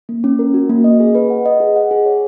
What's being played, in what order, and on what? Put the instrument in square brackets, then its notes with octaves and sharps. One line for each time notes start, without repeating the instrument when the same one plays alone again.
[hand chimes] A#3
C#4
A#4
F#4
A#3
D#5
G#4
B4
F#5
D#5
G#4
F#5
G#4
C#5